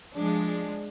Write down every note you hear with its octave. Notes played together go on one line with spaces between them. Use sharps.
F3 G#3 D4